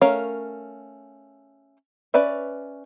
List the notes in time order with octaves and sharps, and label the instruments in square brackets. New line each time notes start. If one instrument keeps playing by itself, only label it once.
[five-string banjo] A3 C#4 A#4 C#5 F5
C#4 B4 D5 E5